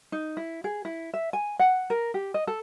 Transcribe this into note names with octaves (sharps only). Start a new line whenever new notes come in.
D#4
E4
G#4
E4
E5
G#5
F#5
A#4
G4
D#5
A4